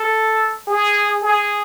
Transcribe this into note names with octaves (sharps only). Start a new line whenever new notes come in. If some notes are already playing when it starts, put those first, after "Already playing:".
Already playing: A4
G#4
G#4